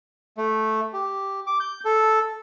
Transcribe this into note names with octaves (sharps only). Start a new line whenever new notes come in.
A3
G4
D6
G6
A4